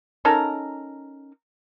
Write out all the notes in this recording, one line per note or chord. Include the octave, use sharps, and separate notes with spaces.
C#4 D#4 A4 A#4